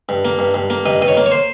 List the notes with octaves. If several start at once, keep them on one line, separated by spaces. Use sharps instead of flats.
G2
A#3
G2
G2
A#3
G2 D#5
G2 D#5
C#5
A#3
C#5
C5